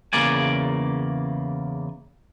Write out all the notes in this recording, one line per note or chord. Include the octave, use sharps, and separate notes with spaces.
E2 C#3 A#3 D5 G#5